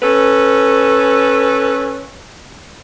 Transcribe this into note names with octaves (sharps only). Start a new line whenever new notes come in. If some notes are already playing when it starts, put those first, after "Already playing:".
C#4 A4 B4